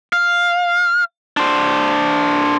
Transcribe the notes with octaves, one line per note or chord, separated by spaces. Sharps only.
F5
D4 C5